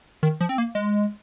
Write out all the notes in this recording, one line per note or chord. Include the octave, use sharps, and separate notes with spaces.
D#3
F3
C4
A#3
G#3